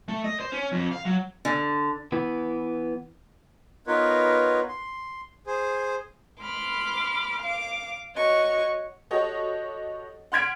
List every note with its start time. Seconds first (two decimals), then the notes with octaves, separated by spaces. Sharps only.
0.08 A3
0.24 D#5
0.40 C5
0.52 C#4
0.72 F2
0.91 F5
1.05 F#3
1.45 D3
2.12 E3 B3
3.87 B3 D#4 F4 A#4 B4 C#5
4.69 C6
5.47 G#4 C5
6.41 B5 C6 D6 F6
7.41 F5 D6
8.15 F#4 C#5 D#5 C#6
9.11 F#4 G4 A4 C#5 D#5
10.32 F#5 C6 F6 G#6 B6 D7